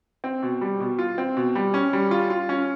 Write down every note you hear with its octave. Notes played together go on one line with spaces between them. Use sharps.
C4
B2
G3
B2
F4
C4
B2
G3
C#4
G3
F4
F4
C#4